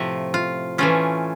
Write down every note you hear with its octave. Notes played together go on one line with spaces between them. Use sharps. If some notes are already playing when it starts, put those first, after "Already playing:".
Already playing: A2 C3 F3 A3
F4
E3 A3 C#4 F4